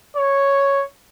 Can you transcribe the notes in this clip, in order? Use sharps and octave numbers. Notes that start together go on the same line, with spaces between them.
C#5